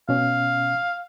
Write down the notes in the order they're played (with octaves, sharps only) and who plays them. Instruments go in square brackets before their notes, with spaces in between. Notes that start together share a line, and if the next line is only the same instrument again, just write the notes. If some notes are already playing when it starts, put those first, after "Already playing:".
[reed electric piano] B2 C#4 [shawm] F5